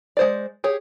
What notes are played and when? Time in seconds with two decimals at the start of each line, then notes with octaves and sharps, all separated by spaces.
0.17 G#3 C5 D5
0.64 G4 G#4 C#5